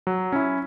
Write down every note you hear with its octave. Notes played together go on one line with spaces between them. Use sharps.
F#3
C#4 E4